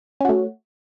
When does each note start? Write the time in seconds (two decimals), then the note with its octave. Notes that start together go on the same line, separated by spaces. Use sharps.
0.20 C#4
0.25 F#4
0.29 A3